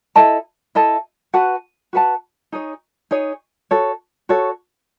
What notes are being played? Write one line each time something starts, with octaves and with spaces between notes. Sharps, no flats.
E4 A4 D#5 A5
E4 A4 D#5 A5
F#4 B4 F#5 A5
F#4 B4 F#5 A5
D#4 G#4 C#5
D#4 G#4 C#5
F#4 A4 C#5
F#4 A4 C#5